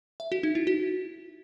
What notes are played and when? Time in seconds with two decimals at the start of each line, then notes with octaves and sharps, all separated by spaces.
0.20 E5
0.32 F#4
0.43 D#4
0.55 E4
0.67 F#4